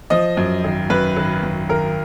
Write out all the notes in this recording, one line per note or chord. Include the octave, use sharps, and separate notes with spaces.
F3 D#5
F#2
G#1
F#2 B4
G#1
F#2
G#1 A#4